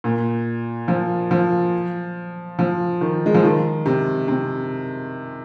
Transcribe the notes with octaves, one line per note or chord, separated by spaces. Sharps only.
A#2
F3
F3
F3
D#3
G#3
F3
D#3
C3
C3